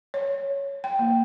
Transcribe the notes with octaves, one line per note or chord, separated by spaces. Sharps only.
C#5
G5
A#3